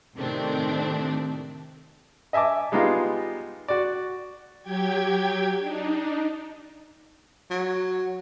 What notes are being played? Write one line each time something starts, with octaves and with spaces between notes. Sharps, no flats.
A2 C3 D#3 A3 C4 D4
D#5 E5 G#5 A5 D6
G3 G#3 B3 D#4 F4
F#4 D5
F#3 G4 G5 G#6
D4 D#4
F#3